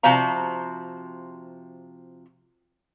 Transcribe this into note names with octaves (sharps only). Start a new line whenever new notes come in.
C3 F3 F#4 C5 F5 A#5